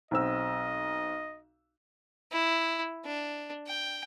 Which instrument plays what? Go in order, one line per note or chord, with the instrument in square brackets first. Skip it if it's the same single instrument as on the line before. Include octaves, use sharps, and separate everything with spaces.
[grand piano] B1 C4 E6 [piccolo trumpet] D#5
[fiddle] E4
D4
G5